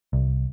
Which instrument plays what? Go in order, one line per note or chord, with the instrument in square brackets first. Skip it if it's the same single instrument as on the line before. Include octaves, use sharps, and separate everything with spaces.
[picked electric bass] C2